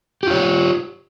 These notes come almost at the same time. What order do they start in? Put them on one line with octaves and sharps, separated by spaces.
G4 F4 C#5